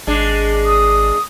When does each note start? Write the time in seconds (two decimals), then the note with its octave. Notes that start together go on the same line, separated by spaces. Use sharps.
0.07 G#1 G#3 D4
0.65 D#6